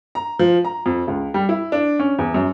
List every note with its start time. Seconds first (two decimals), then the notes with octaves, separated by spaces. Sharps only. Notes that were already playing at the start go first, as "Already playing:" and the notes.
0.15 A#5
0.39 F3
0.64 A#5
0.86 F2
1.08 C#2
1.34 G3
1.49 E4
1.72 D4
1.99 C#4
2.19 E2
2.34 F#2